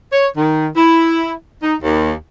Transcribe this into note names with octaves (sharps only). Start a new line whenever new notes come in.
C#5
D#3
E4
D#4
D#2